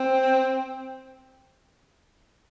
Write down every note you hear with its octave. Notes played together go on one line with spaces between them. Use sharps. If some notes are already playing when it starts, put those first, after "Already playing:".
Already playing: C4